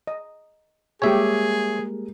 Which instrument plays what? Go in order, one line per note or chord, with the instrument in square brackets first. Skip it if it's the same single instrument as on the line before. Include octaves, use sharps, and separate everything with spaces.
[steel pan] D#5
[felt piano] G3 G#3 A#3 [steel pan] G4 G#5 [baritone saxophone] G#4 [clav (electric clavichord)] C#5 E5